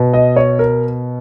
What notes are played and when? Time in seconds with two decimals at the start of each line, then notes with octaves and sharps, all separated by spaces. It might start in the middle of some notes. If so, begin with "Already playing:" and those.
Already playing: B2
0.14 D#5
0.36 C#5
0.59 A#4